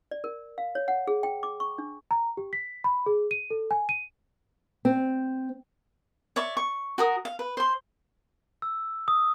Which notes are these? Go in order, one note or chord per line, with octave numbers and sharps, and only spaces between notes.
D5
A#4
F5
C#5
F#5
G#4
G5
D6
C#6
D4
A#5
G4
B6
B5
G#4
D#7
A4
G#5
D#7
C4
C#5 D5 E5 C#6
C#6
F#4 A#4 D#6
F5
B4
C5 C6
E6
D#6